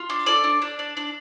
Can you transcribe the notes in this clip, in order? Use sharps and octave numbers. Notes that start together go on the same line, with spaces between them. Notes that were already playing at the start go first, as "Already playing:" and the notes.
Already playing: F4
D4
A4 D5
D4
D4
D4
D4